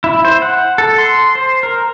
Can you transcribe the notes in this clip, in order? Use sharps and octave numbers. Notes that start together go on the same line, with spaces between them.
E4
C5
F#5
A4
C6
C5
A#4